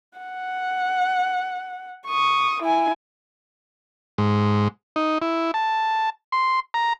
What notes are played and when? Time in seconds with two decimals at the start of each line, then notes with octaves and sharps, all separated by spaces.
0.19 F#5
2.08 C#6 D#6
2.62 E4 G#5
4.18 G#2
4.96 D#4
5.22 E4
5.54 A5
6.32 C6
6.74 A#5